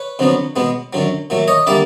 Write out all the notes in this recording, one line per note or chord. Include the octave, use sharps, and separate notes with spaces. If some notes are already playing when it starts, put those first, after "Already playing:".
Already playing: B4 C#5
F2 D3 F#3 B3
B2 G#3 B3
F#2 D3 F#3
A#2 F#3 A3
C#5 D#5
D3 G3 A#3 D5 E5